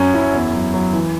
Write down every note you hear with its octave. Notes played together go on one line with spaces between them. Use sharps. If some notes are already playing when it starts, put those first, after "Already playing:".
Already playing: F#2 F#3 C#4
F#2 E4
E2
F#3
F#3
E3